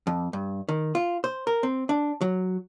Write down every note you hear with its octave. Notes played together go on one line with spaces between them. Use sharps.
F2
G2
D#3
F4
C5
A#4
C4
D4
F#3